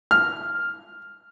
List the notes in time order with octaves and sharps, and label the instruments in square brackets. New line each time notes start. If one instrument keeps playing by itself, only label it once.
[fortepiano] F6